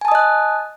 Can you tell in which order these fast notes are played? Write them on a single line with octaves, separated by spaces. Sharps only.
G#5 A5 D#6 D#5 F#6